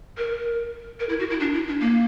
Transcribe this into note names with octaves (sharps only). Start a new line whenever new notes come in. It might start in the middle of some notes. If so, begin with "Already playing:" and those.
A#4
A#4
E4
F#4
E4
D4
E4
D4
A#3